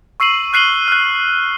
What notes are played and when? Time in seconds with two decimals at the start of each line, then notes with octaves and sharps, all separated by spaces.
0.20 C#6 E6 C7 D#7 F#7
0.53 F6 F#6 C7 D#7 F#7 G7
0.88 F6 F#6